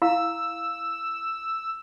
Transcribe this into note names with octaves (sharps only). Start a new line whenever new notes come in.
E4 F5 A#5 E6